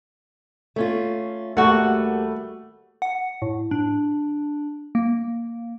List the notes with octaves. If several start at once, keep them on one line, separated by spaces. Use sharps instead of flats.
A3 C#4 F4
D#2 G3 A3 A#3 F#4 F#5
F#5
A2
D4
A#3